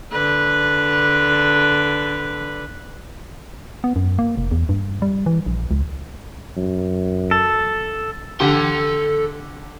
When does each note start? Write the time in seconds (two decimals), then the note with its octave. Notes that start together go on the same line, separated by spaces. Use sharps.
0.13 D3 B4
3.84 B3
3.96 F#2
4.19 A#3
4.37 F1
4.51 E2
4.69 G2
5.02 G3
5.26 E3
5.46 A#1
5.71 C#2
6.57 F#2
7.31 A4
8.40 D3 G4 A4 C6